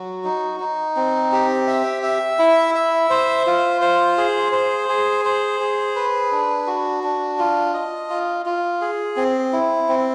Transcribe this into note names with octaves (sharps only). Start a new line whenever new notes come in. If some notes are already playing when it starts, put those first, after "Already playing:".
Already playing: F#3 F#4
D#4
D#4
C4
G4
E5
E5
E4
E5
C5
F4
C5
G#4
C5
G#4
C5
G#4
B4
D4
F#4
D4
F4
D#5
F4
F4
G#4
C4
E4
C4